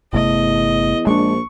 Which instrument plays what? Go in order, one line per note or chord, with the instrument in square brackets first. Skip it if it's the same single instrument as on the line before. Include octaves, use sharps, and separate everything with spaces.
[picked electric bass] G1 C3 A3 [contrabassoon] E2 [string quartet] D#5
[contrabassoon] A#1 [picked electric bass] G#3 D4 [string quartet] C#6